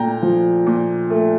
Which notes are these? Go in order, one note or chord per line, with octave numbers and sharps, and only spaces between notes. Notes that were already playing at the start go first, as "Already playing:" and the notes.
Already playing: A#2 A3 G5 A#5
F3
A#2
A3